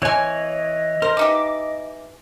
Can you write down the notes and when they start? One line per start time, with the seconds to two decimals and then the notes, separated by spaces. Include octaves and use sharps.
0.02 E3 C4 C#5 D#5 G#5
1.02 A#4 C5
1.17 E3 D#4 G4 D6